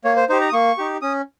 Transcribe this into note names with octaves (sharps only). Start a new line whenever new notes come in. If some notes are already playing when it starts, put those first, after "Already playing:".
A#3 C#5
C5
D#4 G4 C5
A#5
D#6
A#3 C#6
D#4 G4
C#4 D#6